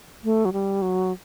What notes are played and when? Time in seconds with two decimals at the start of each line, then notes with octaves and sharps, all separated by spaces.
0.24 A3
0.45 F#3
0.53 G3
0.82 F#3